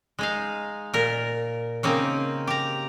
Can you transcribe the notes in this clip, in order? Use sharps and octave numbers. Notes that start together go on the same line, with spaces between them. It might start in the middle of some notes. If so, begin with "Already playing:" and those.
G#3 D#4 F5
A#2 A#4
C#3 A#3 C4 D#4
G4 A#5